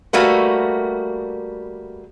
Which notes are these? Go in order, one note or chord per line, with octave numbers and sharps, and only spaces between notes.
G3 A3 A#3 F#4 B4